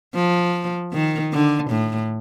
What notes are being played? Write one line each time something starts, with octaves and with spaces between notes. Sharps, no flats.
F3
D#3
D3
A2